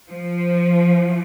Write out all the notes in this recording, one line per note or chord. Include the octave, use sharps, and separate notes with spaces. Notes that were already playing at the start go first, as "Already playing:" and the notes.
F3